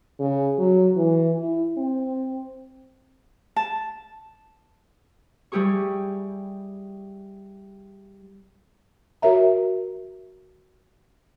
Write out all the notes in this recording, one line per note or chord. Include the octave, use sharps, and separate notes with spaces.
C#3
F#3
E3
E4
C4
A5
G3 E4 G4 G#4 C#6
F#4 A#4 C#5 E5 A#5